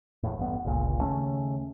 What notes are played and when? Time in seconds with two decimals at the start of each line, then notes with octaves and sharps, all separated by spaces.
0.23 E2 A2
0.38 A1 G2 B3
0.65 G1 C#2 A#2
1.01 D#2 C#3 A3 C#4